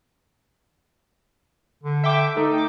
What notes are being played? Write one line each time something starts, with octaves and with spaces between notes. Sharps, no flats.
D3
E5 G5 D6
A3 D#4
G5 D6